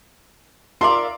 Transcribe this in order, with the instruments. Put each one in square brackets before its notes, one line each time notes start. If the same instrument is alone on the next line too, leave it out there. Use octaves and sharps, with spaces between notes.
[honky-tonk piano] F4 E5 F5 [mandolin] A4 A#4 D5 [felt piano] C6